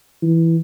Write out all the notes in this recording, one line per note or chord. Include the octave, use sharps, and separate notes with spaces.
E3